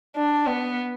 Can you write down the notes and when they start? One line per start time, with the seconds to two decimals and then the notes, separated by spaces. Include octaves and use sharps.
0.17 D4
0.47 B3